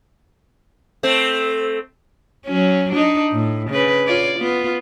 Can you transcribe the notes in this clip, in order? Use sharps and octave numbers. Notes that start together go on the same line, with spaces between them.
A3 C4
F#3 C#4
D4 D#4
A2
C#3 B4
F4 C#5 D5
B3 F4